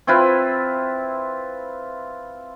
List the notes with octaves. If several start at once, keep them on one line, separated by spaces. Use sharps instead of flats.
C4 E4 F4 B4